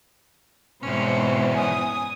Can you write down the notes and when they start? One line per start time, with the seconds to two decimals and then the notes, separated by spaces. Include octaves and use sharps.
0.83 E2 G#2 B2 C4 C#4
1.56 G#5 D#6